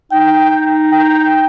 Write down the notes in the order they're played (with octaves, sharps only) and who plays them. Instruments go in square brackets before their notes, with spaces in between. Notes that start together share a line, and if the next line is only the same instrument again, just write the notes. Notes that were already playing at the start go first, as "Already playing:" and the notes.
[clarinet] D#4 [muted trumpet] G5
[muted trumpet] G5